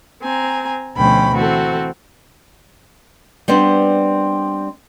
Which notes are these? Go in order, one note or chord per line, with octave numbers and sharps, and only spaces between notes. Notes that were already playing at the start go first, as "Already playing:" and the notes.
C4 G#5 A#5
D2 B2 F3 C#4 G5 B5
E3 C4 F#4 A4
G3 B3 C4 D4